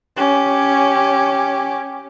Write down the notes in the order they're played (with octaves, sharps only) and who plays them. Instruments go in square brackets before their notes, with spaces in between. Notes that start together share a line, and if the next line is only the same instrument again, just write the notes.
[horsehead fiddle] C#4 G4